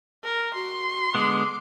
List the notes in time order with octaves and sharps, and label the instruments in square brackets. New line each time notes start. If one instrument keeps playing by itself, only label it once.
[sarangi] A#4
[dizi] F#4 [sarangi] C6
[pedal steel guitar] D3 G#3 B3 [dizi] D6